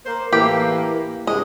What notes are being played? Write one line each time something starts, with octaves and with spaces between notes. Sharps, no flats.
A#3 C5
A2 E3 A#3 G4
G2 C3 G#3 D#5